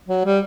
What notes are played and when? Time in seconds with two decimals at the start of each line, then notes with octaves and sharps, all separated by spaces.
0.09 F#3
0.25 G3